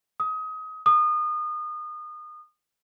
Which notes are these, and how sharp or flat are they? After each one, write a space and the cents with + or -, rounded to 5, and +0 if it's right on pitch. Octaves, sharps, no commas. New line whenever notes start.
D#6 +25
D#6 -30